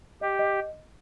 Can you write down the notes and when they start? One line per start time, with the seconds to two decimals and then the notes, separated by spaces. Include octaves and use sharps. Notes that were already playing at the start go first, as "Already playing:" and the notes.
0.21 G4 D#5
0.39 D#5